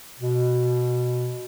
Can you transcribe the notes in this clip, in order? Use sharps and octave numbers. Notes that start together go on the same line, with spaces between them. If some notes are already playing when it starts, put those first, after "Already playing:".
B2